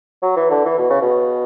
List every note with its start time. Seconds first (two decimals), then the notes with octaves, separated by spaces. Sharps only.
0.23 F#3
0.36 E3
0.51 D3
0.65 E3
0.78 B2
0.90 C#3
1.02 B2